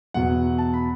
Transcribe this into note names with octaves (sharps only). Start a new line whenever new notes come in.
E2 B2 F#3 B3 F#5
A5
B5